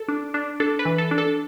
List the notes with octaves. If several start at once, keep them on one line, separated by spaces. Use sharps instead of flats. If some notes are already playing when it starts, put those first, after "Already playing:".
Already playing: A4
D4
D4
D4 A4
B4
E3
A4
D4
A4